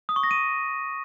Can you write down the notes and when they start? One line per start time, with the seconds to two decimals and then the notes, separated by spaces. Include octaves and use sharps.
0.09 D#6
0.16 C#6
0.23 A#6
0.31 D#7